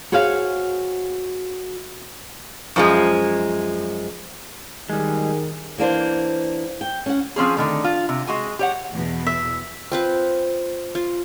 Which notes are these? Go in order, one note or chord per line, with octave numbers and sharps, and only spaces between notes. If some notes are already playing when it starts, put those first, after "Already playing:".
F#4 G#4 C5 C#5 F5
F#2 F3 G#3
D#3 G3 G#3 G#4
E3 A#3 D4 C5
G5
C#4 F#5
F3 C4 C#4 G#4
D3 D#3 A3
F4
C3
G#3 F#4 G#5
G4 C#5 F#5
E2 B2
E5
C4 F4 B4
F4